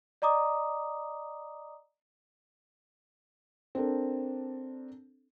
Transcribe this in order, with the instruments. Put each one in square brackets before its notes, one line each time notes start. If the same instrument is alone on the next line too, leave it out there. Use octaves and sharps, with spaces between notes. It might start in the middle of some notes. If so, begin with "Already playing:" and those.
[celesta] D5 D#5 A#5 D6 D#6
[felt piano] C4 D4 A4 A#4